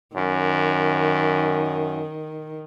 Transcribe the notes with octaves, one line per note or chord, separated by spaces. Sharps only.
F#2 D#3